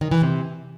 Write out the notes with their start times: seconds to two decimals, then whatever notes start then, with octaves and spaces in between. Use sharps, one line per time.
0.01 D#3
0.11 E3
0.22 C3